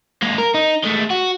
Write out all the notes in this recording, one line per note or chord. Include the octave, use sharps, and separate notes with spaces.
G#3 A#3
A#4
D#4
G#3 A3
F#4